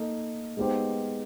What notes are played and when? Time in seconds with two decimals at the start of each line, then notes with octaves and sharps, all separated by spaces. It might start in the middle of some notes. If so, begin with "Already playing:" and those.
Already playing: A#3 D#4 A4
0.57 G#3 B3 D#4 G4 C5